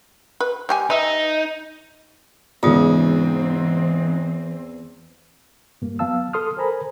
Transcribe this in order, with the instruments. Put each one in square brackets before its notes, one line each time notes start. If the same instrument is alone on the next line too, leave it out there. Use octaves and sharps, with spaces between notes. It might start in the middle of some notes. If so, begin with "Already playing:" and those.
[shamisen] B4
G3 G4 G#5
[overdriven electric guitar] D#4 [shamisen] B4 E5
[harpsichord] E2 [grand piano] G#2 C#3 [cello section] E3 C4 [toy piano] F4 G#4 D#6
[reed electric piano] G2 G3 A#3
F#3 B3 F5 A5 E6
A4 C6 D#6 F6
A4 A#4 C5 G#5 A#5 B5